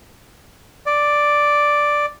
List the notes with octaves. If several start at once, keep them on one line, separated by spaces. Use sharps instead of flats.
D5